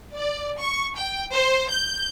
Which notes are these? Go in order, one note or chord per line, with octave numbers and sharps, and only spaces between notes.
D5
C#6
G5
C5
G6